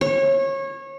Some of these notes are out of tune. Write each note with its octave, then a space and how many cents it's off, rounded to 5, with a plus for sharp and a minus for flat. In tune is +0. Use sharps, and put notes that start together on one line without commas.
C#5 -25